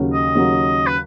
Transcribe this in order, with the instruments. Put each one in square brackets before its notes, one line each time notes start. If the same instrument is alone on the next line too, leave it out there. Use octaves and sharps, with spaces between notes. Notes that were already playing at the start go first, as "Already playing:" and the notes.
Already playing: [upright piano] D#2 C#3 F#3
[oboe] D#5
[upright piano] D#2 C#3 F#3
[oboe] B4